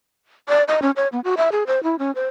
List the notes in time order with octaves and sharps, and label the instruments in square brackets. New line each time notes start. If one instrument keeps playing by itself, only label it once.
[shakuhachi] D5
D#5
C#4
C#5
B3
F#4
E5
G#4
C5
E4
C#4
C5